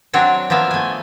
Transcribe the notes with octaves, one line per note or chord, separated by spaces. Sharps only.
F#3 C4 D4 F#4 C#5
F3 A#3 B3 E5 F5
A3 G#5